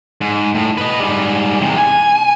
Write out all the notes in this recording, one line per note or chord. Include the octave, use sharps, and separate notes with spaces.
G#2
A2
B4 D#5
G#2 G3
E2 C3
G#5